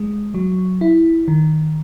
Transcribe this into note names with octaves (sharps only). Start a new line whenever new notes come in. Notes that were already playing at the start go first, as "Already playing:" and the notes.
Already playing: G#3
F#3
E4
D#3